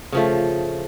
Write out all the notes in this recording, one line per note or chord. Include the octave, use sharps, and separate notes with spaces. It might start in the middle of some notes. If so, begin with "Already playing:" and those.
C#3 F3 A3